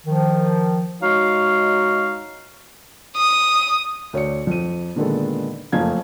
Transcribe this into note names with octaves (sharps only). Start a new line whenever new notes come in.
D#3 F3
G#3 D#4 F#4 C#5 F5
D#6
D2 C#5 D5 C#7
F2 D#7
A#2 D3 D#3 G#3 B3 A4
F#1 F2 A3 F5 G#6